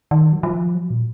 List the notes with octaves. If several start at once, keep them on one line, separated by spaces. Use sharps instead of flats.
D#3
F#3
F3
F#3
A#2